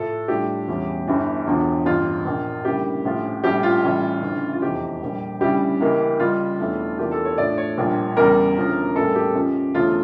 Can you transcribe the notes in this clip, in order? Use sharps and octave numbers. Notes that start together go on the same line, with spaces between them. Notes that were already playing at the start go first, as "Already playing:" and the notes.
Already playing: A2 F3 A3 A4
A2 G3 D4 F4 G4
E1 E2 E3 G3 C#4
G1 G2 E3
E1 E2 D3 F3
A1 G2 F3 F4
A#1 A#2 F3 A#3
D2 C#3 G3 A#3 E4 G4
A#1 A2 F3 C#4 F4
A#1 A2 G3 C#4 G4
F4
A1 A2 G3 C#4
D2 C#3 E3
F4
F1 E2 E3 G4
A#1 A#2 G3
D2 C#3 G3 C#4 E4 G4
C#2 C#3 E3 A#3
C#2 C#3 G3 F4
E1 E2 E3 A3 D4
E2 E3 A#3 D4 F4 G4
A4
C#5
A2 F3 A3 D4 D5
C#5
A#1 A#2 G3 D4 F4
E2 C#3 G3 A#4
E1 D2 C#3 F3
A2 G3 A#3 C#4 A4
G4
C#2 C#3 F3 C#4
E1 D2 C#3 F3 A3 F4